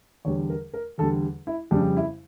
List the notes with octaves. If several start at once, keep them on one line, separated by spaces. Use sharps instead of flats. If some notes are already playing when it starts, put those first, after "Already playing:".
E2 D3 G3 C#5
A#4
A#4
E2 D3 G3 A4
E4
F2 C#3 G3 D4
E4